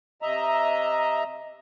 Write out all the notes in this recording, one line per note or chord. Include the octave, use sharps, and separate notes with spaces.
C3 D#5 E5 A#5